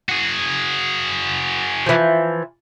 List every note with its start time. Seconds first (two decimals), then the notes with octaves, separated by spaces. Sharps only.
0.09 F#4 G#4
1.86 E3 F3